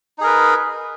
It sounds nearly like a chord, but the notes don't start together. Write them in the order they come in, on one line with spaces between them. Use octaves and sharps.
D#4 G#4 A#4 B4